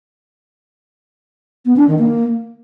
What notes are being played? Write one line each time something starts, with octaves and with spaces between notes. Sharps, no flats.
B3
D4
D#3
A#3